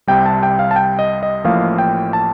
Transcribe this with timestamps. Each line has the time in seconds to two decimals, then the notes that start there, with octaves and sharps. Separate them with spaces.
0.07 C2 C3 G3 G5
0.26 A5
0.43 G5
0.59 F5
0.71 A5
0.76 G5
0.99 D#5
1.23 D#5
1.44 A1 A2 F3 A#3 F5
1.78 G5
2.13 A5